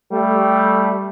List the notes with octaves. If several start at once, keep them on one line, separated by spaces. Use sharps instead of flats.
G3 A3